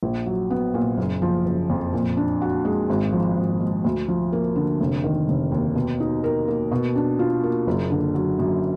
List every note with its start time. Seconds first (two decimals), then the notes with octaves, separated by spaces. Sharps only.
0.03 A#1
0.26 F#3
0.50 B3
0.74 A#2
0.97 F#1
1.22 F3
1.45 F#1
1.70 F2
1.93 A#2
2.17 D4
2.42 F#4
2.65 G#3
2.90 G#1
3.13 F3
3.37 G#1
3.60 G#2
3.84 D2
4.08 F3
4.33 A#3
4.56 D3
4.80 F1
5.04 D#3
5.28 F1
5.52 D#2
5.75 B2
6.00 D#4
6.24 A#4
6.48 A#3
6.72 B2
6.96 D4
7.19 F4
7.43 A#3
7.67 F#1
7.91 D3
8.15 F#3
8.39 F#2